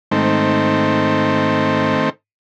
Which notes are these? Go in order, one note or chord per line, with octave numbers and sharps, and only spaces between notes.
G#2 D#3 A3 C4